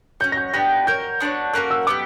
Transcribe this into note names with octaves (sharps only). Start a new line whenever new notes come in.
C#4 F#4 C#5 G6
A#6
G6
B3 D4 G4 A#6
F#4 A#4 C#5 G6
B3 D4 F#4 C#5
A#3 C#4 F#4 A#4 F#6
E6
B3 E4 G4 D6